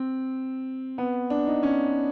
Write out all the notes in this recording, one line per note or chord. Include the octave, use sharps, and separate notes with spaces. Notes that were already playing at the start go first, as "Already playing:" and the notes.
Already playing: C4
B3
D4
D#4
C#4